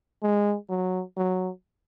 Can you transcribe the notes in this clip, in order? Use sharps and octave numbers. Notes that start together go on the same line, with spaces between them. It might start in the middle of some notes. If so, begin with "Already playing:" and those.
G#3
F#3
F#3